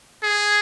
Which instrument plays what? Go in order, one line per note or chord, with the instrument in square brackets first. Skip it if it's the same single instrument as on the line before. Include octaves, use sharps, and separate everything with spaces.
[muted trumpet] G#4